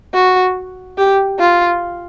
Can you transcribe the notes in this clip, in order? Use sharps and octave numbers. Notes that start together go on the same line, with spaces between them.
F#4
G4
F4